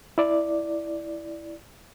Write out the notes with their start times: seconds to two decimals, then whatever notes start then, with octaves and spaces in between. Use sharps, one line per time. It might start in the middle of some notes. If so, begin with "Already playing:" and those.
0.18 E4 D5